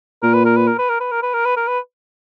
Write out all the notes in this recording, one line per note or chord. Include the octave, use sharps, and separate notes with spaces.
A#2 A#4
B4
A#4
B4
A#4
B4
A#4
B4
A#4
B4
A#4
B4
A#4
B4